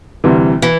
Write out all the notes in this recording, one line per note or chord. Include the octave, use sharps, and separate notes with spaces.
D2 C3 E3 G3
E3